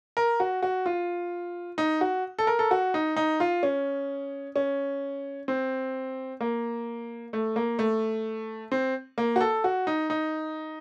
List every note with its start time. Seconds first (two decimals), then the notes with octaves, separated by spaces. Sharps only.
0.17 A#4
0.40 F#4
0.63 F#4
0.86 F4
1.78 D#4
2.01 F#4
2.39 A4
2.47 A#4
2.59 A4
2.71 F#4
2.94 D#4
3.17 D#4
3.40 F4
3.63 C#4
4.56 C#4
5.48 C4
6.41 A#3
7.33 A3
7.56 A#3
7.79 A3
8.72 C4
9.18 A#3
9.36 F#4
9.41 A4
9.64 F#4
9.87 D#4
10.10 D#4